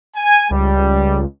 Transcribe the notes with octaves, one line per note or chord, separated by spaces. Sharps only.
G#5
C#2 G3